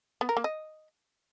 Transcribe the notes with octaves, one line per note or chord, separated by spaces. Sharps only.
B3
A#4
A#3
D#5